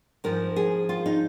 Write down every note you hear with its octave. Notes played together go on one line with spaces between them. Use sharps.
G#2 F3 A#4
G#4
F4
D#4